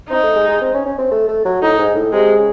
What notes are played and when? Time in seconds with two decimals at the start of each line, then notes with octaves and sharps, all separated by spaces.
0.10 C4 D#4
0.23 A3
0.36 G#3
0.48 G#3
0.61 C4
0.74 C#4
0.85 C#4
0.98 C4
1.11 A3
1.28 A3
1.45 F#3
1.62 A2 D#4
1.78 G#2
1.95 A2
2.13 C3 G#3
2.38 C#3